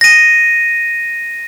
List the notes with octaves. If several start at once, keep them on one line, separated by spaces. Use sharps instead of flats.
A#6 D#7